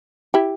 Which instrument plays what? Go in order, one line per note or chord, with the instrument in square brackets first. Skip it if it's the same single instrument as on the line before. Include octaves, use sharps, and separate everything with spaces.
[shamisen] E4 G4